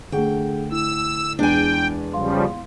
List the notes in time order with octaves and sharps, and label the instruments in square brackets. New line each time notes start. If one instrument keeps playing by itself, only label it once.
[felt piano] D3 A3 [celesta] D4 G#4 F#5 [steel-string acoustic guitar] G5
[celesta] E4 [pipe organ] E6
[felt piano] E2 G#3 [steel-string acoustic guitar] D4 G#5 [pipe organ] G5
[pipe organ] C#3 F3 G3 [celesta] F5 C6